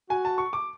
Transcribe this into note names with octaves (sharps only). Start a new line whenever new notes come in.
F#4 G#5
A5
C#6
D6